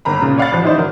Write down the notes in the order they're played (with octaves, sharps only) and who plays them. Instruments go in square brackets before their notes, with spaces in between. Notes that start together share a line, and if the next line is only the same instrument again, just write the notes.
[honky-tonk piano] G1 A#3 A#5 B5
A#2 C#3
C#5 D5 F5 F#5 B5 A6
A1 F3
E3 D#4 E4 C5 D5
G1 F#3 A#4